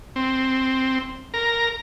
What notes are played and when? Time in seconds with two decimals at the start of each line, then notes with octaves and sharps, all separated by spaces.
0.16 C4
1.34 A#4